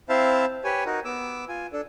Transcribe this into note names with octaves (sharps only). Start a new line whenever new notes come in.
C4 E4 C5 E5 F5 A5
G4 B4 C#5 G#5
D#4 F#4 A#4
B3 D6 E6
F4 G#5
D4 A4